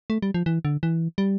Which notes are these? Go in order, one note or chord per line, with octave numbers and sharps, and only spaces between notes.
A3
G3
F3
E3
D3
E3
G3